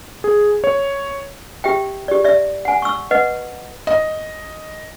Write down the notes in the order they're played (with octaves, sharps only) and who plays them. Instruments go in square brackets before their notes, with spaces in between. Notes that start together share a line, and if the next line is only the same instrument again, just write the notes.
[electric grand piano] G#4
C#5
[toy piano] G4 E5 G5
G4 D5
D5 E5
F#5 G#5
C#6 E6
B4 D#5 F#5
[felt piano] D#5